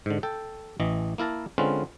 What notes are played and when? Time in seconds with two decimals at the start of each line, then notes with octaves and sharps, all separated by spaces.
0.06 G#2 D3
0.23 A4 G5
0.80 A1 E3 D#5
1.18 A#3 E4 A#4 A5 A#5
1.58 D3 G#3 C4 C#4 F4 B4